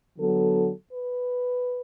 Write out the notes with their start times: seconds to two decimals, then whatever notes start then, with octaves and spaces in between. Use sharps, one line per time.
0.18 D3 F#3 B3 A4
0.92 B4